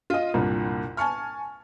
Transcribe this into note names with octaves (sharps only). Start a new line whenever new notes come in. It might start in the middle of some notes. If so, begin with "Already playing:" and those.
F4 D#5
C2 G2 A#2
G#5 A5 C#6 F6